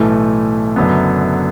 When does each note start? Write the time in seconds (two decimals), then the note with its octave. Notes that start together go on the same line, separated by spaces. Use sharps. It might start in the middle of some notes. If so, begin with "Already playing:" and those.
Already playing: B1 A2 E3 A3
0.76 F#1 F#2 D3 F#3 B3